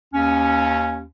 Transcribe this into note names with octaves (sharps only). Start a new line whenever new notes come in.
D#2 C#4